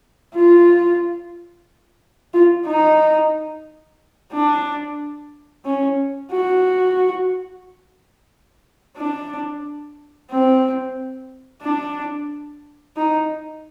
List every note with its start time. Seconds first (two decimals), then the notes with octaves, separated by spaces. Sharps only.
0.35 F4
2.34 F4
2.66 D#4
4.33 D4
5.65 C#4
6.32 F#4
8.97 D4
10.31 C4
11.62 D4
12.96 D#4